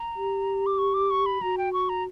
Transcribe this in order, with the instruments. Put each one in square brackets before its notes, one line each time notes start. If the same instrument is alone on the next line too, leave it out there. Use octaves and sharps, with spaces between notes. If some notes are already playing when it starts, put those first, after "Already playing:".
Already playing: [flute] A#5
[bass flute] G4
[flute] D6
C#6
D6
C#6
B5
[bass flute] F#4 [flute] A#5
[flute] G5
C#6
A#5